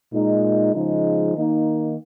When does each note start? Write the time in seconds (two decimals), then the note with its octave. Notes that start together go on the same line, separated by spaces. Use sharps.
0.12 A#2 G#3 D#4
0.73 C#3 F3 G#3 D#4
1.34 D#3 A#3 D#4